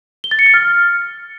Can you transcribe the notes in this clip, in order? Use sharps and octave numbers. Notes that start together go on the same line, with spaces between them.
G7
A6
C#7
A6
F6